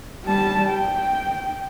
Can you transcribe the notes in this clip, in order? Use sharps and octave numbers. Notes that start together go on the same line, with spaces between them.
G3 A5
G5